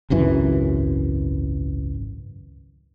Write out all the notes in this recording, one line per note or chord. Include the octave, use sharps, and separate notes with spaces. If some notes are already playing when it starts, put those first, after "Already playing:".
G#1 C#2 F#2 E3